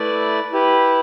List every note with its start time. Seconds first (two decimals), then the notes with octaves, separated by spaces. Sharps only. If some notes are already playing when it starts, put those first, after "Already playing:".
Already playing: A3 E4 B4 D5
0.52 E4 G4 B4